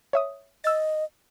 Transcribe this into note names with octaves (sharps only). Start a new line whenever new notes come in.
C#5 E5 D#6
D#5 E6 A6